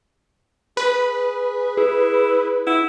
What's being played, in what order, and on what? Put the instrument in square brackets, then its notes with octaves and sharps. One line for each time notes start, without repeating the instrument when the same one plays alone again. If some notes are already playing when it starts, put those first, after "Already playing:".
[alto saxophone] G#4 [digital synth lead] B4
[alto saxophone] E4 [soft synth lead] G#4
[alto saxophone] E4 [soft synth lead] F#5